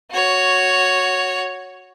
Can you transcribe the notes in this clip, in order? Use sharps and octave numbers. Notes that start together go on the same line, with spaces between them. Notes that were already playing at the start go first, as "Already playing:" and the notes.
F#4 C#5